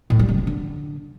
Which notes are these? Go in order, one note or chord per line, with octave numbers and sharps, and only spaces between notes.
A2
G3
C#3
E3
D3